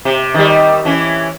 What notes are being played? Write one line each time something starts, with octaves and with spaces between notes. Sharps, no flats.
C3
D#3 G3
E3 C#4